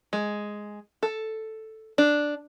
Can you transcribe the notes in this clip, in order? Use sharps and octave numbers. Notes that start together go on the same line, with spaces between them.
G#3
A4
D4